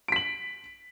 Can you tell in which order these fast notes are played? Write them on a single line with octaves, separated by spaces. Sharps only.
D7 B6 F#7